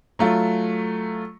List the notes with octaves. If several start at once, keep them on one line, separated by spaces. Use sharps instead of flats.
F#3 A3 F4